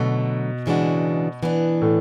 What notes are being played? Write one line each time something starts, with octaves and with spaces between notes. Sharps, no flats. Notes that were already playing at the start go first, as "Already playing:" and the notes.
Already playing: B2 D3 F#3 A3
C#3 E3 G#3 D4 F#4
E3 B3 D4
A2